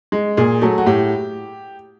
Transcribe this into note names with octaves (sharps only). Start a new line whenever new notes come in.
G#3
A#2 G#4
F#3 A3
F#4
A2 G4